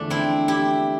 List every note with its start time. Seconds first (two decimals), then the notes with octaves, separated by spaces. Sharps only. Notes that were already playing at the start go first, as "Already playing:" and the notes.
Already playing: E2 D3 F3 A3 D4
0.10 C4 E4
0.48 E4 G4